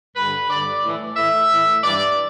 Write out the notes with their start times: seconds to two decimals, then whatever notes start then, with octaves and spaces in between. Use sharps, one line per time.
0.16 G2 D3 B4
0.50 G2 D3 D5
0.83 A2 E3
1.17 A2 E3 E5
1.50 A2 E3
1.84 G2 E3 D5